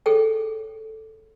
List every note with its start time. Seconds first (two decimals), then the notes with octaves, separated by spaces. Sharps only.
0.06 G#4 A4 C#5 G5